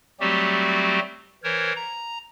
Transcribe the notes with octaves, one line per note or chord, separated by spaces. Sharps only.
F#3 G3 A3 C4 F#4 G4
E3 A#4 C5 C#5
A#5